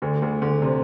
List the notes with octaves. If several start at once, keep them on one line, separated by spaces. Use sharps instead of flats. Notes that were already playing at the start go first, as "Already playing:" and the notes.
D2 D3
D2 D3
D2 D3
C3